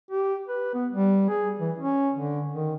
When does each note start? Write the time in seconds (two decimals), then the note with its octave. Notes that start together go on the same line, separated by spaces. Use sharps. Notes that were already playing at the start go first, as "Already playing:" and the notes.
0.11 G4
0.48 B4
0.74 B3
0.92 G3
1.29 G#4
1.60 E3
1.79 C#4
2.16 D3
2.52 D#3